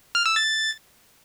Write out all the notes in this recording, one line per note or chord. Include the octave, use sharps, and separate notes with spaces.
F6
E6
A6